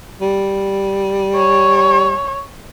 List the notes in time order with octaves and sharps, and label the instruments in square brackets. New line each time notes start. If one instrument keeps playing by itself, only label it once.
[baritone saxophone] G3
[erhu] C#5